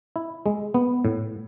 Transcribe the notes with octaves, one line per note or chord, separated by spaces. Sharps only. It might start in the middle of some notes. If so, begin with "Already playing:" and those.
E4
G#3
B3
A2